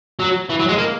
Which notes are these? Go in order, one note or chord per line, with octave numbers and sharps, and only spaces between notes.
F#3
E3
F#3
G#3
A#3